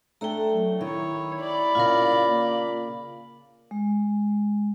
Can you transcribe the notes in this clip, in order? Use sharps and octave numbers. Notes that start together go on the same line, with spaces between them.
A3 D4 A4 G5 A#5
F#3
D#3 E4 C#5
D5 B5
A#2 C#3 F4 A#4
A#3
G#3